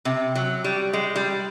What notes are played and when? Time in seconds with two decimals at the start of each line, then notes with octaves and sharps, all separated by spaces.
0.05 C3
0.35 F#3
0.64 G3
0.93 G#3
1.16 G3